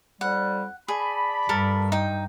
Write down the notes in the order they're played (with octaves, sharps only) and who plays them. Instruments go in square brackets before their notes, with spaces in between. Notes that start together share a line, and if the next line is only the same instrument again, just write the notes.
[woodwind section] F2 G3 [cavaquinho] F#5
[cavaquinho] G#4 [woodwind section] D5 A5 B5
[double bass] G2 [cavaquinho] A4 A#4
[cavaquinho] D#4 G5